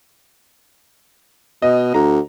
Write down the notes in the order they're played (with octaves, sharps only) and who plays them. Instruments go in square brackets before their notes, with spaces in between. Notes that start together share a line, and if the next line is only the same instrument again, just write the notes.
[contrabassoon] B2 [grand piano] D#5
[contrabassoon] D2 [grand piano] A#5